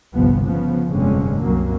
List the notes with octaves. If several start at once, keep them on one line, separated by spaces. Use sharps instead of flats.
G1 C2 F3 B3
C#3 F3 B3
F1 G2 A#2 D3 G#3 C#4
C2 F#2 F#3 A#3